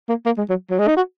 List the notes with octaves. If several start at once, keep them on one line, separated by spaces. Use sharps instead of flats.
A#3
A#3
G#3
F#3
F#3
G#3
D#4
F#4